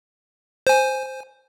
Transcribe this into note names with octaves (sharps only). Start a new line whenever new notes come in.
C5 G#5